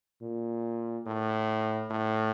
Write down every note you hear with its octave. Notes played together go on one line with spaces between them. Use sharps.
A#2
A2
A2